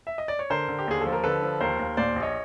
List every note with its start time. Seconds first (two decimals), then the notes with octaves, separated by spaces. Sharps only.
0.07 E5
0.18 D#5
0.28 D5
0.39 C#5
0.50 D3 A#4 C5
0.68 D3
0.79 G4
0.88 D#2 G#4
1.01 F3 A4
1.13 A#4
1.24 D3 A4 B4
1.42 F3
1.61 D#2 A#4 C5
1.79 D#2
1.97 A#2 C5 D5
2.16 A#1
2.22 C#5 D#5